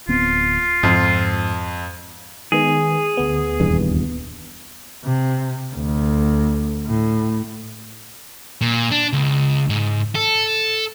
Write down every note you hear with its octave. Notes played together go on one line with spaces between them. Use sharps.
D1 B3 C4 F4
F2 G#2
D#3 G#3 B3 G#4
D2 B3
D#1 E2 G2
C3
D2
A2
A#2
D4
C#2
G#2
A4